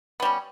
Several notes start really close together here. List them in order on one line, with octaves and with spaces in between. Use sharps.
B3 G3 C#4